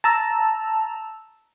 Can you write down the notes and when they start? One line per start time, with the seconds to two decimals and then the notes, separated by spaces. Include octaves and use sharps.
0.04 A5 A#5 E6